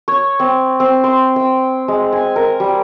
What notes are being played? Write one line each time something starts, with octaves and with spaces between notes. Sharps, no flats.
C#5
C4
C4
C6
G5
G#3
G#5
A#4
G3